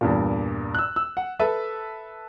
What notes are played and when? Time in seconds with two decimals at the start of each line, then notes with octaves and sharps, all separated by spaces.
0.01 E2 G2 A#2
0.75 E6 F#6
0.96 E6
1.17 F#5
1.39 A4 B4 E5 A5